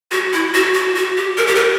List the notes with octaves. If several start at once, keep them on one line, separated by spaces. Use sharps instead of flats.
F#4
E4
F#4
F#4
F#4
G4
A#4
G4
A#4